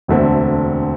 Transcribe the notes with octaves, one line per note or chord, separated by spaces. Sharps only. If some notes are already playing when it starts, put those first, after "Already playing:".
E1 D2 D3 A3 C4